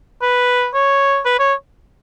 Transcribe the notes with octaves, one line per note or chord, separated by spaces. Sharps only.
B4
C#5
B4
C#5